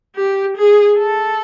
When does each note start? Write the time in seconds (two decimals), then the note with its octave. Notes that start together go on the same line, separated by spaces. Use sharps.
0.16 G4
0.57 G#4
0.98 A4